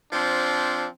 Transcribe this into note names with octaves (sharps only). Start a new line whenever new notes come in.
F3 C4 D4